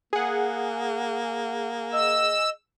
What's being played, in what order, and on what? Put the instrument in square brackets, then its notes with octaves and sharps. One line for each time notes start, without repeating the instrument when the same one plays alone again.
[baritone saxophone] A#3 [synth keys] G#4 F#5
[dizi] D#5 [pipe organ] E6